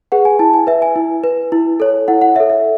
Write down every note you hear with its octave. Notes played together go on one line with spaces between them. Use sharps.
G#4 B4 F#5
G#5
E4 A5
G#5
B4 E5
G#5
E4
B4
E4
A4 C#5
E4 F#5
F#5
A4 C#5 E5
E5